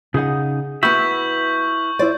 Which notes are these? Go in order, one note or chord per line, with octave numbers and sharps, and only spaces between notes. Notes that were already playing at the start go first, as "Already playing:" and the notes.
C#3 D#4 G#4 F#5
B3 E4 F#4 B4 E5 C#6 G6 F#7
E4 C5 D5